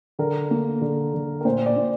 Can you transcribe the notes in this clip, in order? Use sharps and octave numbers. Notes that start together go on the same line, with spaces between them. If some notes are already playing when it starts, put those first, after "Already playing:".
D3 A#4
A#3
D3
D3
A#4
A#2 C5
D5
A#2